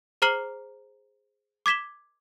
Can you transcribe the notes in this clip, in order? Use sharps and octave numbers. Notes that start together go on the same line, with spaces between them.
G#4 C5 A#5 F6 C7 F#7
D6 G#6 B6 E7 G7